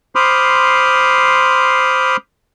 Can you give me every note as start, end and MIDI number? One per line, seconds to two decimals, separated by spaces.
0.15 2.17 72
0.15 2.17 83
0.15 2.17 84
0.15 2.17 86
0.15 2.17 87
0.15 2.17 89